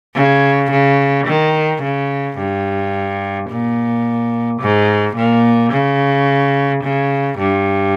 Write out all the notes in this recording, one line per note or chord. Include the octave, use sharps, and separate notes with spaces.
C#3
C#3
D#3
C#3
G2
A#2
G#2
A#2
C#3
C#3
G2